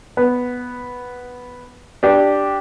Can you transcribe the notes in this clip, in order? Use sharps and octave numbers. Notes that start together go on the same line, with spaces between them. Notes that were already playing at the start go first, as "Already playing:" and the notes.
B3
D4 G4